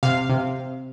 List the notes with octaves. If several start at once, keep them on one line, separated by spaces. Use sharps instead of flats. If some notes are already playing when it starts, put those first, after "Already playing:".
C3 F5
C3